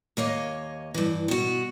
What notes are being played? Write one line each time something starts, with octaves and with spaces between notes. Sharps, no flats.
D#2 A#3 C#5 D#5
G2 E3
B2 F#4